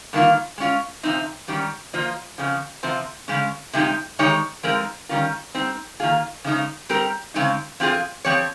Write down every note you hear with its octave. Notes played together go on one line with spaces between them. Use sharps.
G2 D#3 A#3 F4
G#3 C#4 F4
C3 F3 C4 D#4
G#2 D#3 G3 C#4 G4
F3 A#3 F4 C5 D#5
F2 C#3 F3
C3 F3 C4
C#3 G#3 C#4
C3 F3 G#3 D#4 G4
D#3 G#3 D#4 G4 C#5
F3 G#3 C4 D#4 A#4
D#3 G3 C#4 F4 A#4
G3 C4 D#4
D#3 A#3 F4 G#4
C#3 F3 G#3 D#4
G3 C4 G4 A#4
C#3 G#3 C4 D#4
F3 C4 F4 G#4
F3 C4 G4 C#5